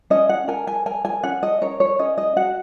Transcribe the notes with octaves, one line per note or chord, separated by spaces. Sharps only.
C#4 D#5
F#5
A#4 G#5
G#5
A#4 G#5
G#5
C#4 F#5
D#5
A#4 C#5
C#5
C#4 D#5
D#5
F#4 F#5